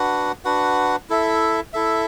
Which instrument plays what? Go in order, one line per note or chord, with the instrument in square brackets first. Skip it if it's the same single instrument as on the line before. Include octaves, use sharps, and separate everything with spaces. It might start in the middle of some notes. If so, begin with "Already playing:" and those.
Already playing: [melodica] D4 F#4 B4 F#5
D4 F#4 B4 F#5
E4 A4 E5
E4 A4 E5